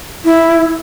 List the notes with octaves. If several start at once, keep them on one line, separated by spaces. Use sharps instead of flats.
E4